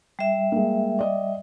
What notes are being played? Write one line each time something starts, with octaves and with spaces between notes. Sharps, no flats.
G3 E5
G#3 A#3
D5 D#5